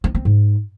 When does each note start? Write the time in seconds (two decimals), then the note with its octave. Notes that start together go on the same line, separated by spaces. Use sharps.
0.04 C4
0.15 C4
0.25 G#2